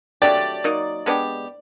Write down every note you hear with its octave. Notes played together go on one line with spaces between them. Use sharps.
F#3 A3 D4 G4 D5
F#3 A#3 D#4
G#3 B3 D4 G4